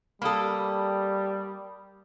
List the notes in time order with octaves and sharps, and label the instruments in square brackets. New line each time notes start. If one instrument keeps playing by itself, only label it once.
[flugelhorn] G3 [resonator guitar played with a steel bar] A#3 A4 [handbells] B5 D#6